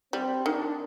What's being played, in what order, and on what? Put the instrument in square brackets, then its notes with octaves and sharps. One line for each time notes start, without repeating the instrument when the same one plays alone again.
[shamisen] G3 [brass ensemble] C4
[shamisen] D#3 [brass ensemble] D4